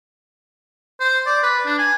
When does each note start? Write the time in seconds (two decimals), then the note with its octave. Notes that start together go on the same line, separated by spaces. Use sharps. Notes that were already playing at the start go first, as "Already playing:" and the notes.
1.00 C5
1.26 D5
1.43 B4
1.66 D4
1.78 G#5